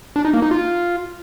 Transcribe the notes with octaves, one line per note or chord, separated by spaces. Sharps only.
D4
D#4
A#3
D#4
F4